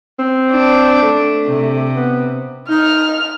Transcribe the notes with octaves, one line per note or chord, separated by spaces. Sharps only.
C4
D4
A3
C3
B3
D#4 F6